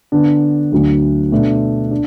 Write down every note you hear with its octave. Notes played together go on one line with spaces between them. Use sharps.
D3 B3 D4
D2 D3 F#3 D4
B2 A3 D4
D4